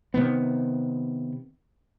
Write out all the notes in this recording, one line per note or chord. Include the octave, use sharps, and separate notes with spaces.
C3 D#3 B3